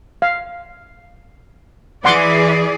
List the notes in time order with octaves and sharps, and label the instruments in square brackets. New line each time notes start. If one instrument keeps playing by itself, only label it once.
[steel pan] F5
[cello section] E3 G#4 D5 [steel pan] F#5 C6 D6